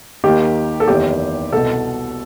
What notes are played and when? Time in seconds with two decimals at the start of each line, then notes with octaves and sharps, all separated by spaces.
0.24 D#2 D#3 G4
0.80 A4
0.87 F#1 E2 D#3 G4
1.52 C2 B2 A4